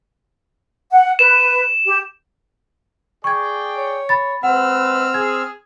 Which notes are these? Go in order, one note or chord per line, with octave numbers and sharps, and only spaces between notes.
F#5
B4 E7
G4
G#4 D5 G5 C#6 G#6
C#5
B5 A6
G#3 C4 B4 F#5 E6 F6
G#4 G#6